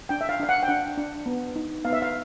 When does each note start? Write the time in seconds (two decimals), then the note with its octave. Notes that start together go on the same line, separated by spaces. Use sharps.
0.09 D4 G5
0.21 E5
0.29 F5
0.40 D4 F5
0.49 F#5
0.63 G5
0.68 D4 F#5
0.98 D4
1.26 B3
1.56 D#4
1.85 B3 F5
1.93 E5
2.02 F5